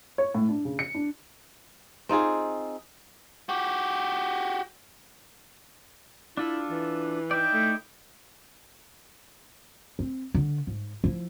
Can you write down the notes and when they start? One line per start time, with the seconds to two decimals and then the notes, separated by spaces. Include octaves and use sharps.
0.18 C#5
0.35 A2
0.49 D4
0.65 C#3
0.79 C#7
0.95 D4
2.09 C4 D#4 F4 G#4
3.49 F#4 G4
6.37 D4 E4 F4 A4
6.70 E3
7.31 D#4 E4 D5 G5
7.54 A3
9.99 C4
10.34 D3
10.67 G#2
11.04 F3 E4